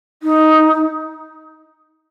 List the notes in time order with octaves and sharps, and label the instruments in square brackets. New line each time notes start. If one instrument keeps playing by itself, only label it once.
[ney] D#4